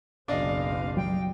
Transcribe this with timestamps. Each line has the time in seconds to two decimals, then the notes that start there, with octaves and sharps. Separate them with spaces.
0.28 F#1 B1 D4 D5 D#5 F5
0.97 F#3 G3 G5